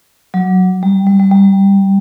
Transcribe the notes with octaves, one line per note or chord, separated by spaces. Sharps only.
F#3
G3
G3
G3
G3